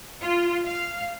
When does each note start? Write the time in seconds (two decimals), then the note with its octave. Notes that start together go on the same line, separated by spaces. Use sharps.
0.21 F4
0.68 F5